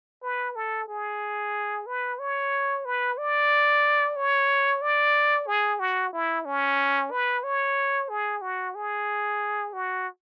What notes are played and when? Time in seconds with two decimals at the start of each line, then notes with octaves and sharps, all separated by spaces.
0.23 B4
0.56 A4
0.88 G#4
1.86 B4
2.19 C#5
2.85 B4
3.18 D5
4.16 C#5
4.82 D5
5.47 G#4
5.80 F#4
6.13 E4
6.45 C#4
7.11 B4
7.44 C#5
8.09 G#4
8.41 F#4
8.75 G#4
9.73 F#4